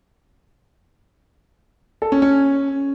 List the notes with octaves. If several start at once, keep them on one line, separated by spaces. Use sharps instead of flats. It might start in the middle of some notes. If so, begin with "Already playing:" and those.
A4
C#4
C#4